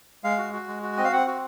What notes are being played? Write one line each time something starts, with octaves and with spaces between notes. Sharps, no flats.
G#3 F5
F#4
F#4
G#3
F#4
C4 D#5
F5
C4 F#5
F#4